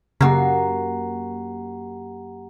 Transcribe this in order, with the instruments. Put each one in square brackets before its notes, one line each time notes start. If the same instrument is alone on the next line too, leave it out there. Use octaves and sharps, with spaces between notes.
[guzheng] F#2 A#3 [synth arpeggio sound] C#3 [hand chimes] G4 F#5 A#5